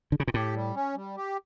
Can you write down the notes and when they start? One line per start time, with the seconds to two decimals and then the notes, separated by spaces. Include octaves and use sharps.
0.12 D3
0.20 C#3
0.28 A#2
0.34 A2 G4
0.54 G3
0.75 C#4
0.95 G3
1.17 G4